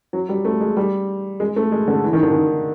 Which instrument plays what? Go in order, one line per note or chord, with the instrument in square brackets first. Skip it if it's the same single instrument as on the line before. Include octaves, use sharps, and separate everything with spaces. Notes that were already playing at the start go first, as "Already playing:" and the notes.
[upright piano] F#3
G3
A3
G#3
G3
G#3
A3
G#3
D3
E3
D#3
D3
D#3